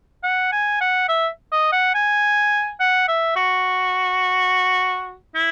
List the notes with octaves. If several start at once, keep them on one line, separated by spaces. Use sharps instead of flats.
F#5
G#5
F#5
E5
D#5
F#5
G#5
F#5
E5
F#4
E4